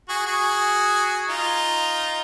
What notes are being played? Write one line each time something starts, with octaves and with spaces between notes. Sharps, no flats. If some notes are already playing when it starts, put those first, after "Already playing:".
F#4 G#4
F#4 G#4
D#4 F4